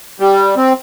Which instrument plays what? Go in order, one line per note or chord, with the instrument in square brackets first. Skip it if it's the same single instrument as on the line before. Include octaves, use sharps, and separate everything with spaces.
[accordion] G3
C4